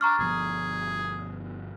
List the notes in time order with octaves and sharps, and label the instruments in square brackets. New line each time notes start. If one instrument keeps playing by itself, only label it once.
[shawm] D4 [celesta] A#5 C#6 F6
[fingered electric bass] G1 B2 F3 [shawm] G#4